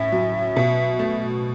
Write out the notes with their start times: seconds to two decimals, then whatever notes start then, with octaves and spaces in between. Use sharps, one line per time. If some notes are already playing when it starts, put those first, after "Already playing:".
Already playing: A2 C#4 E5
0.12 F#3
0.56 B2
0.99 A3